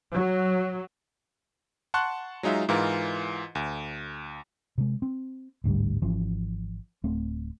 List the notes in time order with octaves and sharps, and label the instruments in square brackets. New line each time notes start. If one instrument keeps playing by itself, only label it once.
[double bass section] F#3
[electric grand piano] F#5 A5 C6 C#6 F#6
F#3 G#3 D#4 F4 E5
G#2 E3 F4 A#4
D2
[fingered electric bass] C3 G#3
C4
A1 D2 G#2 G3
G#1 E3 F3 C#4
D1 A3 C4